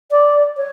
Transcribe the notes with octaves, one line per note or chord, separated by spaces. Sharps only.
D5
C#5